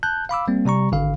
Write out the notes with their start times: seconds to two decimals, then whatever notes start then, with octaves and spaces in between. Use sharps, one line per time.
0.03 A5 F#6 G6
0.29 F5 B5 D6 E6
0.48 G3 A#3 C4
0.65 C3 G3 A#5 C#6
0.92 G#1 D3 F5